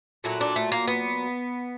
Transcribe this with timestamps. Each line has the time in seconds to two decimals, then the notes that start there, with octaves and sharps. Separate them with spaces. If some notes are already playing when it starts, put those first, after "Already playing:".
0.24 A#2 F#3 A3 E4
0.41 D4
0.56 A3
0.72 A#3
0.88 B3